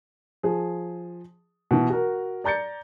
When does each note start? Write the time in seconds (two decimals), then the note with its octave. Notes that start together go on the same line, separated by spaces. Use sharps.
0.43 F3 G#4
1.71 B2 E3
1.90 F#4 A#4
2.44 D5 A#5 G6 A6 C#7